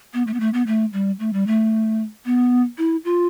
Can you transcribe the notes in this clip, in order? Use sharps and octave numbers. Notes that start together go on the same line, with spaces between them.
B3
A3
B3
A3
B3
A3
G3
A3
G3
A3
B3
E4
F4